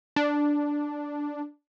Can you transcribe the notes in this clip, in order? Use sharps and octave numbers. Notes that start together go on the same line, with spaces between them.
D4